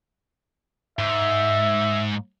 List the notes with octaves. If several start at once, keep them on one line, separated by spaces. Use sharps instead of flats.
G#2 E5